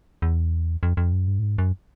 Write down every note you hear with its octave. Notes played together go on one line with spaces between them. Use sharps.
E2
F2
F2
F#2
G2
A2
G#2
F#2